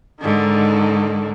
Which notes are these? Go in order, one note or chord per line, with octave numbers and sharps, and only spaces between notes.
G#2 D3 D#3